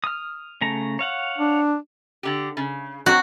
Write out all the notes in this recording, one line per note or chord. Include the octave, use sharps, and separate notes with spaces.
D#6 F6
C#3 A3 A#5
C#5 F5 F#5
D4
D3 G4
C#3
F#3 C4 F#4